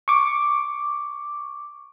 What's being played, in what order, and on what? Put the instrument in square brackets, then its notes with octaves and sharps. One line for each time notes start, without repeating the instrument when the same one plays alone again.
[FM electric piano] C#6 D6